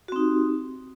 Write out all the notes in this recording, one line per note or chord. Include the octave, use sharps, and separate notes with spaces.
C4 D#4 F#4 G4